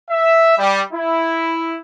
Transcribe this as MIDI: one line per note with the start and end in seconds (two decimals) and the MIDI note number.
0.10 0.56 76
0.58 0.81 55
0.93 1.78 64